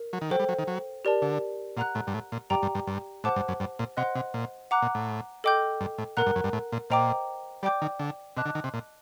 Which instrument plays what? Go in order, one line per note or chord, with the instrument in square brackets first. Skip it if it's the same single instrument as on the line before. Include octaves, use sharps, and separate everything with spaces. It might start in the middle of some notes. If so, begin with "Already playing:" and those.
Already playing: [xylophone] A#4
[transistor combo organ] F#3
D#3
[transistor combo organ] F#3 [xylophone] A4 C5 G5
[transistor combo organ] G3
F#3
D#3
F#3
[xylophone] G4 A#4 D5 A5
[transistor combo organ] D3
[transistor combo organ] A#2 [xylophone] F#5 A#5 F#6
[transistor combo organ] A2
G2
A2
A#2
[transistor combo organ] G2 [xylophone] G4 D5 G5 A#5 D6
[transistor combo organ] G2
G2
G2
[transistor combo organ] A2 [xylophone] C5 F#5 A5 D6 F#6
[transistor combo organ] G2
F#2
G2
A#2
[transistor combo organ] C3 [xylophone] C5 D#5 F#5 C6 F#6
[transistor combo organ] C3
A#2
[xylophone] F#5 A#5 D6 F#6
[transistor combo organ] A#2
A2
[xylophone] A4 D#5 G5 D6 G6
[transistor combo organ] G2
A2
[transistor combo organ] A#2 [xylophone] A#4 F#5 A#5 F#6
[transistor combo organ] G2
F#2
G2
A2
A#2
[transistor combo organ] A#2 [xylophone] C5 D#5 G5 A#5 D6
[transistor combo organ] G3 [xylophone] D5 G5 D6 G6
[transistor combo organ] D#3
D3
[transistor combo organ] C3 [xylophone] D#5 A5 D6 F#6
[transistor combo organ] D3
D#3
C3
A#2